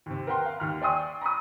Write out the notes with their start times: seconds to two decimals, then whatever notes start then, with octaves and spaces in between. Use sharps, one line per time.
0.06 D#2 C3
0.27 A#4 B4 F#5 G5 A#5 C6
0.46 F5
0.60 D#2 F6
0.82 D5 G5 G#5 C6 C#6 D#6
1.21 A#5 B5 C#6 D#6